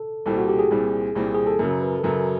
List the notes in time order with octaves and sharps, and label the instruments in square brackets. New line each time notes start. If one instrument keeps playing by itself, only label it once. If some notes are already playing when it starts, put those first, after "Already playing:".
Already playing: [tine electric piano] A4
[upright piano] C2 A#2 G3 C4 [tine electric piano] A4
[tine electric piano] F#4
G4
G#4
[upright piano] C2 A#2 G3 C4
C2 A#2 G3 C4
[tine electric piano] G#4
A4
[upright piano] F#2 C#3 F#3 [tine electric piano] A#4
[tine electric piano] B4
A4
[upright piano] F#2 C#3 F#3 [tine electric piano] A#4